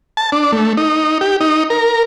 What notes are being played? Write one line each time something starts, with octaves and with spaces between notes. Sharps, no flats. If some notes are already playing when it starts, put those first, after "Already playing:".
A5
D4
A3
D#4
G4
D#4
A#4